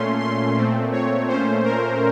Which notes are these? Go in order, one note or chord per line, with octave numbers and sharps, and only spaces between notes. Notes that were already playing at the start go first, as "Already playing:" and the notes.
Already playing: A#2 A3 C#4 C6
C6
A#2 A3 C4
C#5
A#2 A3 C#4 C5
A#4